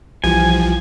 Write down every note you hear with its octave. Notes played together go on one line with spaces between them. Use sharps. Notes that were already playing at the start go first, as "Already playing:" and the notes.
B1 E3 F3 G3 G#5